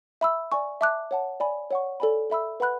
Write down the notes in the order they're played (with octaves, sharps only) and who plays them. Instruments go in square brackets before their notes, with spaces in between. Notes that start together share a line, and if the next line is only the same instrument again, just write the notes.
[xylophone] E5 B5 E6
D5 G#5 C#6
E5 A5 D6 F#6
C#5 F#5 A5
D5 G#5 B5
C#5 F#5 C#6
A4 D5 G#5 B5
A4 E5 B5 E6
B4 F#5 B5 F#6